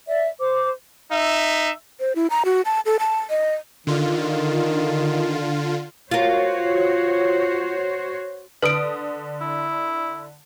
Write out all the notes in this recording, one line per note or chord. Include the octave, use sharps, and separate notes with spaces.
D5 E5
C5 D6
D#4 E5
C5
E4
A#5
F#4
A5
A4
A5
D#5
D3 D#3 F4
F4 F#4 A#4 C5 C#5
D3 B4 D#6 D7
E4